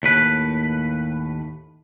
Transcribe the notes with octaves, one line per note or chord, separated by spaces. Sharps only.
D#2 A2 B4